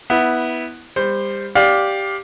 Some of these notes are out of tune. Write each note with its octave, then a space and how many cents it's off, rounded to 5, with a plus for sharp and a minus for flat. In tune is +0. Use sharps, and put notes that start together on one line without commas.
B3 +0 E4 -15
G3 +30 C5 +0
G4 +0 D5 +0 F5 +20